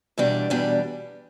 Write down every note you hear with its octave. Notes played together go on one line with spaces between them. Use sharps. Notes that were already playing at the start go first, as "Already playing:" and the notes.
E2 B2 G3 D4
E2 B2 G3 D4